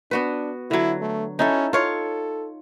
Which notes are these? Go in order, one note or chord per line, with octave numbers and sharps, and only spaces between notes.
B3 D4 F#4 B4
D3 F#3 E4
A3
C#4 D#4 E4 A4
F4 A4 C#5 F5